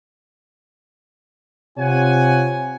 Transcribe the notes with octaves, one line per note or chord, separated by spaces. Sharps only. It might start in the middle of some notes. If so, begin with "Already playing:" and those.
C3 F4 C#5 F#5 G#5